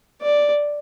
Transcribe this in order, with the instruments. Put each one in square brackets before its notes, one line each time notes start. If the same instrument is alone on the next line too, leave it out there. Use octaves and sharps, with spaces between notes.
[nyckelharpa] D5